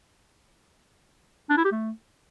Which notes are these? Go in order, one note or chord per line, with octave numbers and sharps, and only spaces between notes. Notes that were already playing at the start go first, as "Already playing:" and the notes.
D4
E4
G4
A3